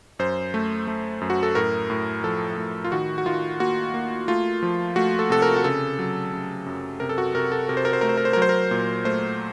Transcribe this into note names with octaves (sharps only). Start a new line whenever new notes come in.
F#2 C5
A3
A3
F#2
F#4
A4
A2 A#4
A2
F3 A4
A2
F4
D#3 F#4
F#4
D#3 F4
A#3 F#4
A#3
A3 F4
F3
A3 F#4
A4
C3 A4
A#4
F#4
C#3 A4
F#3
C#3
F#2
C3 A#4
A4
F#4
C3 A#4
A4
C3 A#4
C5
A#4
C5
A3 A#4
C5
A#4
C5
A#4
F#3
C5
A#4
A#2
A3 C5